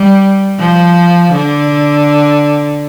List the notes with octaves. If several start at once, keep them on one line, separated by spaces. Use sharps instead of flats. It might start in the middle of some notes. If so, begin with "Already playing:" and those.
Already playing: G3
F3
D3